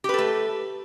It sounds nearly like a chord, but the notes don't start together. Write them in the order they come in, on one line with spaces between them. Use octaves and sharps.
G4 B4 A4 A3